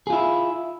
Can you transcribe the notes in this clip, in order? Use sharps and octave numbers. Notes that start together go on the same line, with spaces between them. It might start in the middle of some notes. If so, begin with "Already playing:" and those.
E4 F4 G#4